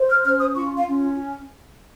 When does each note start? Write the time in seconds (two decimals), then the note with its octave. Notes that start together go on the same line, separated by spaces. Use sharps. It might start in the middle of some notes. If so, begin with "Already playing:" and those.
Already playing: C5
0.09 F6
0.24 C#4 F6
0.39 D#6
0.55 F4 C#6
0.76 F5
0.87 C#4